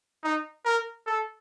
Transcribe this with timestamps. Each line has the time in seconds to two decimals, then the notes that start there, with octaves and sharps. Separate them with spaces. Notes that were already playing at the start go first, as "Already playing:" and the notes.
0.23 D#4
0.65 A#4
1.07 A4